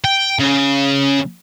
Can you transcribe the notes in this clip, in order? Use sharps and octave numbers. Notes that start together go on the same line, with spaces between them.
G5
C#3